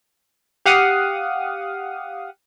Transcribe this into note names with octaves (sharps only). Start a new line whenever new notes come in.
G4 F5 F#5 D#6